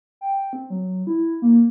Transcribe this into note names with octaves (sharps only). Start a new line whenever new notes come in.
G5
C4
F#3
E4
A#3